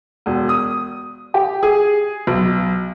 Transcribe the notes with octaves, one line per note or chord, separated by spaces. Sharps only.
E1
D#6
G4
G#4
B1